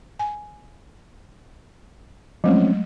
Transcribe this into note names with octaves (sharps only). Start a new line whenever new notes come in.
G#5
F3 F#3 G#3 A3 C4 C#4